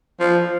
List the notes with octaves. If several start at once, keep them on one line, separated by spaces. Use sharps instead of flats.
F3